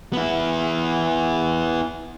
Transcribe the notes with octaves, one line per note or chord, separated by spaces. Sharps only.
B3 E4